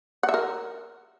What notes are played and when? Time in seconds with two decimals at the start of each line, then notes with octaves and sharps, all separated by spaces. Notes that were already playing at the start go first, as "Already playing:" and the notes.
0.23 F#5
0.29 E5
0.34 A#4